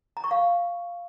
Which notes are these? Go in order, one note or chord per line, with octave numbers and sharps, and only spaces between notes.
A#5
C#6
F5